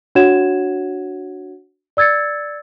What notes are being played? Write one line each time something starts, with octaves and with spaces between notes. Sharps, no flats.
D4 F#4 C#5 F#5 G#6 E7
D5 E6 G#6 A6 C#7